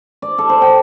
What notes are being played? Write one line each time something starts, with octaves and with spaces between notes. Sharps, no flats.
D5
A4
C5
G5